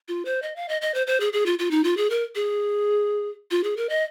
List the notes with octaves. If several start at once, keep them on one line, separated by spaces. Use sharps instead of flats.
F4
C5
D#5
F5
D#5
D#5
C5
C5
G#4
G#4
F4
F4
D#4
F4
G#4
A#4
G#4
F4
G#4
A#4
D#5